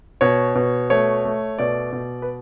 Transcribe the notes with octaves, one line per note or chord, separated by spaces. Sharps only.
B2 C#5
B2
A3 C#5
A3
B2 D5
B2
B4